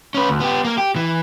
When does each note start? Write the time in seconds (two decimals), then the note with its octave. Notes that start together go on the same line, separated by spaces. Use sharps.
0.14 C#4 B4
0.29 D2
0.40 B3 G4
0.64 A#3 A#4
0.78 G4
0.96 E3